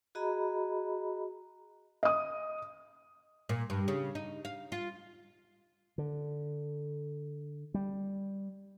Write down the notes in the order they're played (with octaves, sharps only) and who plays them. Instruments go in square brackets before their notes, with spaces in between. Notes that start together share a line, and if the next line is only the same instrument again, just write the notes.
[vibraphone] F#4 G#4 D#5 A#5 B5
[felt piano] D#5 D#6
[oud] A#2
G2
C#3
D#4
F5
F4
[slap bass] D3
G3